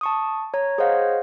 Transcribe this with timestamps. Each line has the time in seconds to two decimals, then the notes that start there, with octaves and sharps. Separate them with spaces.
0.01 A5 C#6 D#6
0.54 C#5 A#5
0.78 G#4 C5 C#5 D#5 F5 F#5